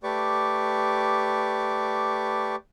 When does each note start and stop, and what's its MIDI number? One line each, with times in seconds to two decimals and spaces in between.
0.03 2.56 57
0.03 2.56 67
0.03 2.56 71
0.03 2.56 74
0.03 2.56 85
0.03 2.56 86